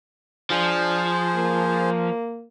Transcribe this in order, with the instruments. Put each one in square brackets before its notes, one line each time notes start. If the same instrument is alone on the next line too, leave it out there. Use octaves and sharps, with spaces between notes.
[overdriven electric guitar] F3 [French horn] D4 [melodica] G#4 C5
[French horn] A#3